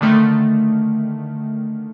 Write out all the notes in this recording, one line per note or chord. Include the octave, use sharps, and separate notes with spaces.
D3 D#3 A3